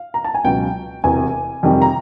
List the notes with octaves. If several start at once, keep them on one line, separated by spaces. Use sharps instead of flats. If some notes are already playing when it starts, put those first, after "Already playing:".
Already playing: F5
A#5
A5
G#5
C#2 B2 F#3 G5
E1 E2 C3 G#5
F2 C3 D#3 G3
A#5